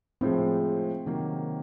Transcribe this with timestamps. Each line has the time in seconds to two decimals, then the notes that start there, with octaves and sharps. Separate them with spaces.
0.21 A2 F3 G#3 C4
1.06 C3 D#3 F#3 A#3